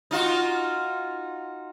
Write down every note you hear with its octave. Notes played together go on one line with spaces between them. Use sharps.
D#4 F4 F#4